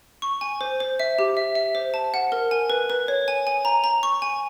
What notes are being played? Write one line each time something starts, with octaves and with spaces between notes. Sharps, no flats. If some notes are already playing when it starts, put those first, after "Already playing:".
C#6
G#5
C5
C5
E5
G4
E5
E5
C5
A5
F#5
A#4
G#5
B4
B4
C#5
G#5
G#5
A#5
A#5
C#6
G#5